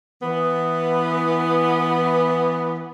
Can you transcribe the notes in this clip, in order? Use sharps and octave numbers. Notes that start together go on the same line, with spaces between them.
E3 B3